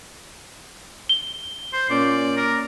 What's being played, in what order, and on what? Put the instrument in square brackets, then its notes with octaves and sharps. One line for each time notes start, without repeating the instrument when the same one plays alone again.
[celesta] G7
[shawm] C5
[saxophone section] A#2 C#4 [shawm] D5
[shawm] A#4